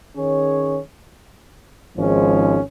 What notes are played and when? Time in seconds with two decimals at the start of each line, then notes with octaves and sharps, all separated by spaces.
0.17 D#3 C#4 G#4 C#5
1.97 G#1 G#2 F3 G#3 C#4